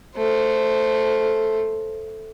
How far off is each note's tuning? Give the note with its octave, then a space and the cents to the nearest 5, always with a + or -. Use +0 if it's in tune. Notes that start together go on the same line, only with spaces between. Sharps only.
A3 +0 C5 +0